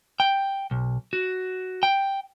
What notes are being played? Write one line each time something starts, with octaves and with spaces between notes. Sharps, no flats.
G5
B1
F#4
G5